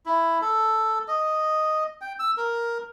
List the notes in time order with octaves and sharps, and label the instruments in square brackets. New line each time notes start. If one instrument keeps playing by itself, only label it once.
[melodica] E4
A4
D#5
G5
E6
A#4